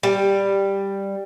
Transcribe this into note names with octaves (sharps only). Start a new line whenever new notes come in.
G3